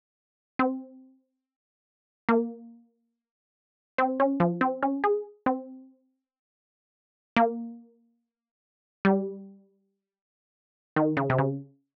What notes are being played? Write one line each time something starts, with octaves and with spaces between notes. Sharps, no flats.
C4
A#3
C4
C#4
F3
C4
C#4
G#4
C4
A#3
G3
D#3
C#3
C3
C#3